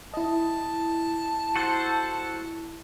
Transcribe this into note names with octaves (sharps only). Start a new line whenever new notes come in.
E4 D#5 A5
F#4 A4 C5